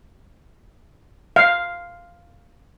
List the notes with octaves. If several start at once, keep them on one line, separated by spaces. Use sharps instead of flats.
F5